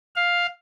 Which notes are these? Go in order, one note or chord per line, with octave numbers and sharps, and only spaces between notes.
F5